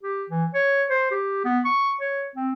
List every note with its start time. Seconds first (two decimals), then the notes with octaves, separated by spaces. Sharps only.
0.03 G4
0.30 E3
0.54 C#5
0.90 C5
1.11 G4
1.45 B3
1.65 C#6
2.00 C#5
2.36 C4